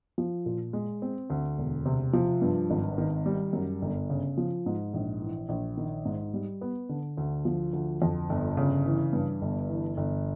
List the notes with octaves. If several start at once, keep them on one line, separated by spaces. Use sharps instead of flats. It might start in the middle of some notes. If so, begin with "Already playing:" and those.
F3
A#2
G#3
C4
D2
E1
C3
F3
G2
G#1
D#3
G3
F#2
G1
C#3
F3
G#2
A#1
E3
A#1
D#3
G#2
G3
B3
D3
D2
F3
D2
F2
G1
C#3
E3
G2
G1
E3
G1